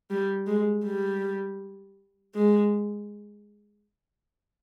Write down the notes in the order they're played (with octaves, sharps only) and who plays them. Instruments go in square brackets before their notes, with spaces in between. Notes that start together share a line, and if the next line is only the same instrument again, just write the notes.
[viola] G3
G#3
G3
G#3